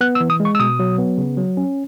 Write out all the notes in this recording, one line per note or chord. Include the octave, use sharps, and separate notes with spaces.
B3 F#6
E6
E3
D#6
G#3
C#6
E6
B2 D#6
F#3
B3
C#3
F#3
C#4